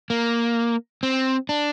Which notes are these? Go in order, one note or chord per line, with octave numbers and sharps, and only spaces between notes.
A#3
C4
D4